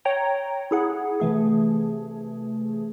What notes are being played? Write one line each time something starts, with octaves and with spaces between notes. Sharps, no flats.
C#5 G5 A#5
E4 G#4 F#5
C3 E3 A3 G#4